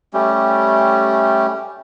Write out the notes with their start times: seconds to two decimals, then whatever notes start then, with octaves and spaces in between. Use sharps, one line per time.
0.14 G3 A3 C#4 G4